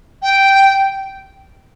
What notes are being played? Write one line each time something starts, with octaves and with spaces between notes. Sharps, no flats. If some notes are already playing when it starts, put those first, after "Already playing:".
G5